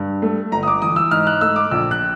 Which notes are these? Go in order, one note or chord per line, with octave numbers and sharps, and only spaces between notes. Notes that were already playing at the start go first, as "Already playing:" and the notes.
Already playing: G2
A3
G1 A#5
D#6
D6
E3 D#6
E6
G#2 F6
F#6
A3 E6
D6
A#1 E6
F#6